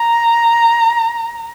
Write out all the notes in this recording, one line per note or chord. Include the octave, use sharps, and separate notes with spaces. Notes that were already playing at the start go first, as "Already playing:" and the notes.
Already playing: A#5